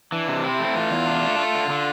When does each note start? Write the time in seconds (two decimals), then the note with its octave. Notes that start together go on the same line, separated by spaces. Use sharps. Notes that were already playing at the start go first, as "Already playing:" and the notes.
0.12 E3 D4
0.28 C3
0.43 C4 E4
0.59 A3
0.75 E3 F4
0.91 E2
1.07 D4
1.23 A3
1.38 A3
1.55 D3
1.70 D3